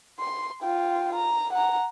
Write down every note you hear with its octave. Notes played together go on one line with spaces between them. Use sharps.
C6
F4 G5
A#5
F#5 A#5